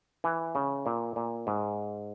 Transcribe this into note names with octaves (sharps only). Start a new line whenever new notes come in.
E3
C#3
A#2
A#2
G#2